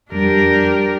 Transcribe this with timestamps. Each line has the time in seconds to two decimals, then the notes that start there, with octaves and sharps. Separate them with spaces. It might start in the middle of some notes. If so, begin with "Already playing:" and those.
0.12 F2 G3 D4 G4 A#4